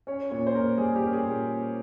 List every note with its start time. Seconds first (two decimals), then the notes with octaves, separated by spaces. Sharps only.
0.07 C#4 C#5
0.31 A#2 C#5
0.47 C5
0.55 A#2 A#4
0.77 G3 G#4
0.96 G4
1.02 C#4
1.13 G#4
1.25 A#2